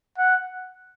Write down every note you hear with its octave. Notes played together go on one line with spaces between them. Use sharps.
F#5